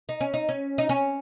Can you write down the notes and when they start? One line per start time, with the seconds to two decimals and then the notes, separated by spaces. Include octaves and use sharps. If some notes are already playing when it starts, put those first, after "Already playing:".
0.09 D#4
0.21 C#4
0.34 D#4
0.49 C#4
0.78 D#4
0.89 C#4